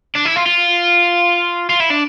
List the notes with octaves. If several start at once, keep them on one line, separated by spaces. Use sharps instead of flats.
D4
E4
F4
F4
F4
E4
D4